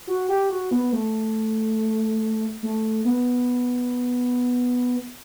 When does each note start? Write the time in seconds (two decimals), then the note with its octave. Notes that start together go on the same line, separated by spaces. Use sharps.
0.07 F#4
0.29 G4
0.50 F#4
0.71 B3
0.92 A3
2.63 A3
3.05 B3